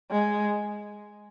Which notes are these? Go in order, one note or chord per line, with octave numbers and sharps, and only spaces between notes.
G#3